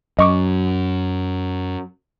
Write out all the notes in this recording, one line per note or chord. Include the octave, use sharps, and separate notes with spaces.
F#2 D#5 C#6 D6